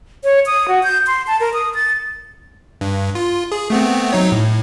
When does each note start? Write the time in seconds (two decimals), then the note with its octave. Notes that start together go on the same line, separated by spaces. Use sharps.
0.24 C#5
0.46 D#6
0.68 F#4
0.83 G6
1.07 C6
1.27 A5
1.40 A#4
1.54 D#6
1.75 A6
2.81 G2
3.15 F4
3.52 G#4
3.70 A3 B3 C4
4.13 F#3 D#4 C#5
4.32 A2